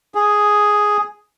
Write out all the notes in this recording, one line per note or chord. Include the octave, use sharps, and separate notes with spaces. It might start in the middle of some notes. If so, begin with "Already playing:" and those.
G#4